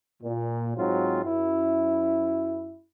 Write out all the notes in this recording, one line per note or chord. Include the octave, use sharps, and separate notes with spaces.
A#2
G#2 F#3 C4 F4
F#2 E4